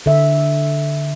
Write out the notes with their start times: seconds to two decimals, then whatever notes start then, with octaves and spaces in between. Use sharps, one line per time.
0.06 D3 E5